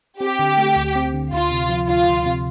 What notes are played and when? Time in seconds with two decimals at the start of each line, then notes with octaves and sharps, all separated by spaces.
0.20 C4 G4
0.39 D3
0.57 A3
0.76 D2
0.95 C4
1.14 D3
1.32 D2 F4
1.51 C3
1.69 F3
1.88 D2 F4
2.07 D2
2.26 C3